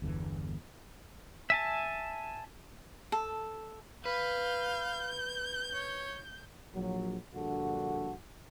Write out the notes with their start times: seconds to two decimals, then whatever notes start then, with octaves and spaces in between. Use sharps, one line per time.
0.02 G1 E2 D3 E3
1.50 E5 G#5 A5
3.12 A4
4.05 B4 F5 G6
5.74 C#5
6.75 A#1 F#3
7.35 A#1 G2 D3 F#4 A4